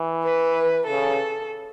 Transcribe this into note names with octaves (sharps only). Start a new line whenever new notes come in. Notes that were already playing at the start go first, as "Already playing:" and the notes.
Already playing: E3
B4
C#3 A4